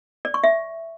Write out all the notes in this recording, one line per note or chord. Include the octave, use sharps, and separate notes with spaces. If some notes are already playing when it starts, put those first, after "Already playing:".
D5
C#6
E5